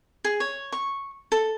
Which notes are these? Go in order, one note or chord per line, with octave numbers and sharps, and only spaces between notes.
G#4
C#5
C#6
A4